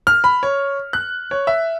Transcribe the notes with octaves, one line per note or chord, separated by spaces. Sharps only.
F6
B5
C#5
F#6
C#5
E5